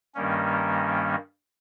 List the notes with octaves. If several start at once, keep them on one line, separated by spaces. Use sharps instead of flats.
G2 D#3 G3 A#3 C#4